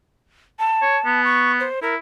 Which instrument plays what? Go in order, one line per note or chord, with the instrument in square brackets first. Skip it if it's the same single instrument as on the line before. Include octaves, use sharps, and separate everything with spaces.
[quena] A5
[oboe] C#5
B3
[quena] C#6
C5
[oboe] E4 [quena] A#4